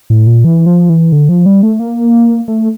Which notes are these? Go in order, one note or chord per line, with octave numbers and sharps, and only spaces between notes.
A2
A#2
E3
F3
E3
D3
F3
G3
A3
A#3
A3